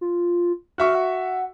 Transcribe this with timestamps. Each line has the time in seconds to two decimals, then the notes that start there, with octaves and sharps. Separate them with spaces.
0.01 F4
0.78 F#4 E5 C#6 F6
0.95 F#5